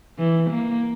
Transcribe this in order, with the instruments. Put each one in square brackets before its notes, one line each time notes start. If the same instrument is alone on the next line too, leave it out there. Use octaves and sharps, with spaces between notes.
[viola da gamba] E3
A#3